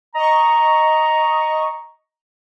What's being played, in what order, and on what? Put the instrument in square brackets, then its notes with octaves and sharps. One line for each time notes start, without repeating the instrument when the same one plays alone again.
[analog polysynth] D#5 C#6 [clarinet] A#5